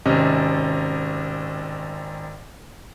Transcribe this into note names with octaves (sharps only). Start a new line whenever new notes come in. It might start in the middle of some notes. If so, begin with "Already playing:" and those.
G#1 C3 C#4 D#5